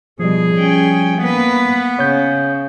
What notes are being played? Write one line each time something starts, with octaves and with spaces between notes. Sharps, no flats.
B2 F3 G3 G#4
C#4 G5
A#3 B3 B4
C#3 C#5 G6